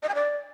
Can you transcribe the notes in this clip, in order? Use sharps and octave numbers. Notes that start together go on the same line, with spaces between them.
D#5
G#5
D5